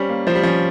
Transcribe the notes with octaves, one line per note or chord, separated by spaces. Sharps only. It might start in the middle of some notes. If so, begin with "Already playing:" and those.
Already playing: G3 C#4 C5
A#3
F3 C5
G3
F3 C#4